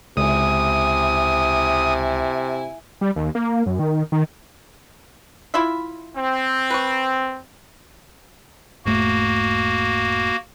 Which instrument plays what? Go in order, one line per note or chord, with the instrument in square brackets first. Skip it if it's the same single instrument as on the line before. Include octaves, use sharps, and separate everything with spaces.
[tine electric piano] C#2 [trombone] C3 [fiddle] E4 G#5 [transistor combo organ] D#6
[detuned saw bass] G3
D#2
A#3
F#2
D#3
D#3
[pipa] E4 F4 E5
[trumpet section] C4
[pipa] B4 C#6
[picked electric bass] E1 G#2 A3 [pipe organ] A#3 F#4